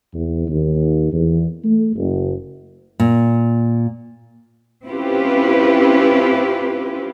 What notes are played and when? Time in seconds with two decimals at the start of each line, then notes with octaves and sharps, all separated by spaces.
0.15 E2
0.48 D#2
1.13 E2
1.65 A3
1.96 F#1
3.00 A#2
4.87 C4 C#4 E4 F4 G4 B4